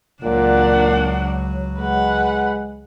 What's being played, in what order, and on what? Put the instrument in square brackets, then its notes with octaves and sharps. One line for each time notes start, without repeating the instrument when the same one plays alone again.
[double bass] C#2 F#3 [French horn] A#2 [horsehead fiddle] D4 F#5
[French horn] G#3 [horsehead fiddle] B4 F#5